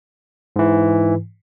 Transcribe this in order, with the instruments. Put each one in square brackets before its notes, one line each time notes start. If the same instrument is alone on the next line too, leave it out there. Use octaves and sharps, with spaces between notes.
[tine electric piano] G#2 E3